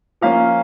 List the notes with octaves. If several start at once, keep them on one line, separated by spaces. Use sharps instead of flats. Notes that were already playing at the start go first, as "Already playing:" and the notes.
F3 A#3 C#4 F5